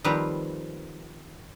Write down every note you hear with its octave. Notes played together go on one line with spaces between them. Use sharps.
D#3 F3 G3 C4 B4 A#5